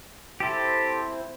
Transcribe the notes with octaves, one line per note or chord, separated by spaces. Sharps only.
C4 E4 G4 A4 C5